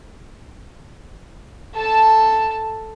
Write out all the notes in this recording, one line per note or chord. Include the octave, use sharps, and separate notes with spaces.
A4 A5